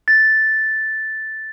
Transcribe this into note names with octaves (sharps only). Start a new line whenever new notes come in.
A6